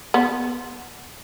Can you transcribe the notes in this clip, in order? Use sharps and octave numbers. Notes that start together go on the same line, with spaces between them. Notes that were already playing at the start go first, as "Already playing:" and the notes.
B3